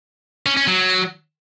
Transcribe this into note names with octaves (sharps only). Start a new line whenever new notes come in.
C#4
C#4
F#3